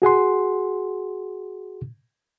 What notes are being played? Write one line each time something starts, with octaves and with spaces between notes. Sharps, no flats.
F#4 G#4 F#5 C6